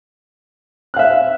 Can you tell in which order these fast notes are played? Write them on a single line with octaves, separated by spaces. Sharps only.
F#6 F5 E5